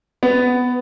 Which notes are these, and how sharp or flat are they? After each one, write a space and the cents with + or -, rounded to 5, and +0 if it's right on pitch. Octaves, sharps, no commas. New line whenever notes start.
B3 +10